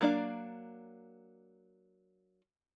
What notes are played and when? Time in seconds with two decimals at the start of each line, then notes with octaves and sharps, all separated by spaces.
0.01 F#3 A#3 D4 D5 F5